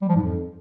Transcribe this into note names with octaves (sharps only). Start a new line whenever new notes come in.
G3
F3
G#2
F2